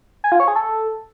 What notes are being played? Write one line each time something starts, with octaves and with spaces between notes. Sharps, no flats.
G#5
F4
C#5
G#4
A4